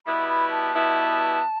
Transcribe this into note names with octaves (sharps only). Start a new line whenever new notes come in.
B2 G3 B3 E4 B5
B5
A5
B2 G3 B3 E4